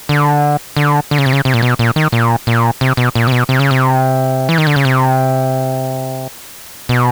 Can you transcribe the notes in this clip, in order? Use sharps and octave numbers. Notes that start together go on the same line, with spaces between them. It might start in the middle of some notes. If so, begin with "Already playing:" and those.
D3
D3
D3
C#3
C3
C#3
C3
A#2
B2
A#2
D#3
A#2
A#2
C3
B2
A#2
C3
B2
C3
C#3
C3
E3
D#3
D3
C#3
C3
B2